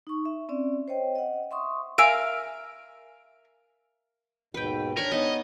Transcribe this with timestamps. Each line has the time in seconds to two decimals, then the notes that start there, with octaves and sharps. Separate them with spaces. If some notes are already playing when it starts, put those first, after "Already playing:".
0.07 D#4 C#6
0.25 E5
0.49 C4 C#4 D5
0.88 C5 C#5 D#5 G5
1.15 D#5 F#5
1.51 E5 C6 C#6 D#6
1.98 A#4 E5 F5 G#5 E6 D7
4.54 D#2 G#2 B2 B4 G5
4.97 D4 A#4 C#5 G#5 B5
5.12 B3 D#4 D#5